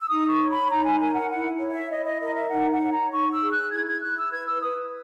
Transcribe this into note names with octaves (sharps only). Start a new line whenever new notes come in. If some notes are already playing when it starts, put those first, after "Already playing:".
E6
D#4 D#6
C#6
C#5
B5
D#4 A#5
G#5
A#4 G#5
F#5
E4 F#5
C#5
E5
E4 D#5
D#5
A#4 D#5
E5
D#4 F#5
F#5
C#5
A#5
D#4 C#6
E6
G#4
F#6
E4 G#6
G#6
E4 F#6
E6
B4 G#6
E6
B4 D#6